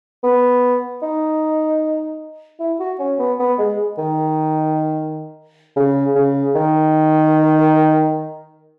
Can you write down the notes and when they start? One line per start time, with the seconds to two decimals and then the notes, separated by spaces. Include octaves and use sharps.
0.23 B3
1.02 D#4
2.60 E4
2.79 F#4
2.99 C#4
3.19 B3
3.39 B3
3.59 G#3
3.98 D#3
5.76 C#3
6.15 C#3
6.55 D#3